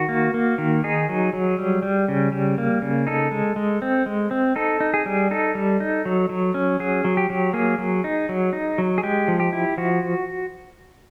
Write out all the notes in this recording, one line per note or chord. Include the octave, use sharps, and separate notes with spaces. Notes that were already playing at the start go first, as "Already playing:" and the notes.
Already playing: D#3 F#4
A#3
A#3
D#3
D#4 G#4
F#3
F#3
G3
G3
C#3
G3
A#3
C#3
D#4 A4
G#3
G#3
C4
G#3
C4
D#4 A4
D#4
G#4
G3
D#4 A4
G3
D#4
F#3
F#3
C#4
F#3 G#4
F#3
G4
F#3
A#3 G#4
F#3
D#4
F#3
D#4
F#3
G#4
G#3 G4
F3
G4
E4
F3 F#4